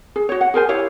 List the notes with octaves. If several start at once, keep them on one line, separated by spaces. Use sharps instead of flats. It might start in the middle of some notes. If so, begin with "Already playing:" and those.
G#4
F#4 C#5
F#5
G#4 A#4 C5 G#5
E4 G4 C#5 F5